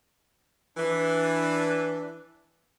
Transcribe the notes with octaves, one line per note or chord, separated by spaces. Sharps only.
E3 D4